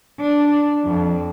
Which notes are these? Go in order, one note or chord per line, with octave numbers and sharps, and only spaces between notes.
D4
F2